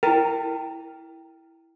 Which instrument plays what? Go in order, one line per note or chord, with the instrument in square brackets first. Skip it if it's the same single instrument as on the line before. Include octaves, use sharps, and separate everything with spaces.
[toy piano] E4 G5 [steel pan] A#4